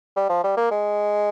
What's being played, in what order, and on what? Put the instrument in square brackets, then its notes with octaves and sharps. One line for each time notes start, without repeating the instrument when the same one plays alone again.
[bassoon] G3
F3
G3
A#3
G#3